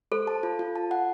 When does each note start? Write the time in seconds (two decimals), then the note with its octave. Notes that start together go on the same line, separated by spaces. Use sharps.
0.12 A4 C5
0.27 A5
0.43 F4
0.59 F4
0.75 A5
0.91 F#5